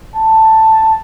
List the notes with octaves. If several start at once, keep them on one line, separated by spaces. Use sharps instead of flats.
A5